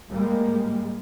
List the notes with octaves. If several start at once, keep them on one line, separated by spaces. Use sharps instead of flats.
A2 G3 G#3 A#3